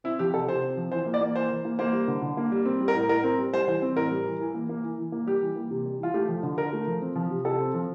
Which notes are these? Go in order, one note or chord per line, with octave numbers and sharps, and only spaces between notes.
C4 E4
F3 G4
C3 A4
C3 C5
C4
F3
E3 C5
A#3
D5
A#3
E3 C5
E3
A#3
A#3 C5
G3
D3
D3
A#3
G3
C4
G3
A#4
A2
A2 A#4
C4
G3
G3 C5
E3 C5
C4
A2 A#4
G3
E3
E3
A#3
A#3
E3
E3
A#3
G3 G4
E3
A#3
C3
G3
E3 F4
A3 G4
F3
D3
D3 A#4
A3
F3
C4
F3
C3
C3 A4
C4
F3